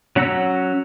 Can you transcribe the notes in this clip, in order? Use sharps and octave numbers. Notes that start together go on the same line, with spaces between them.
F#3 C#4 F#5 A#5 E6